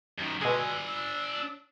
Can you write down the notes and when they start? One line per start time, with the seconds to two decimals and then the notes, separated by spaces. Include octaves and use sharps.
0.19 F#2 D#3
0.41 B2 G#3 D4 G#5 E6
0.88 E6